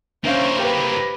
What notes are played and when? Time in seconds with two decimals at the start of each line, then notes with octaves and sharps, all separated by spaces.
0.24 A#3 C#4 D4 E4 C5 E5 F5
0.60 G4 B4 C5 G5